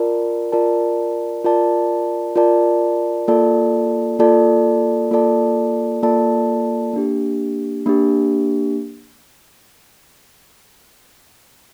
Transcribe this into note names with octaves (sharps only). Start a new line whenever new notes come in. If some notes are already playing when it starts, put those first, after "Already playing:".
Already playing: F4 A#4 D5 A5
F4 A#4 D5 A5
F4 A#4 D5 A5
F4 A#4 D5 A5
A#3 F4 A4 D5 A5
A#3 F4 A4 D5 A5
A#3 F4 A4 D5 A5
A#3 F4 A4 D5 A5
A#3 D4 G4
A#3 D4 G4